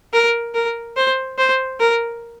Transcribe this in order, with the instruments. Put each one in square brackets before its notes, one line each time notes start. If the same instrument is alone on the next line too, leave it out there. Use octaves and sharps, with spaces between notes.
[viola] A#4
A#4
C5
C5
A#4